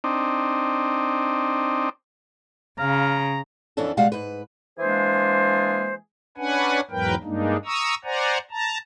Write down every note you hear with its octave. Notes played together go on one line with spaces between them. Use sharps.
C4 D4 D#4
C#3 F5 A#5
F2 E3 B3 C#4 D4 A4
B2 G3 G#3 F5 F#5
G#2 B4
E3 G#3 A#3 D4 G#4 C5
C#4 D4 B4 F#5 G#5
E2 G#2 F#3 A#4 B4 G5
G2 G#3 A#3 D4 D#4
A#5 C#6 D#6 E6
C5 D5 F#5 G#5 A#5
A5 A#5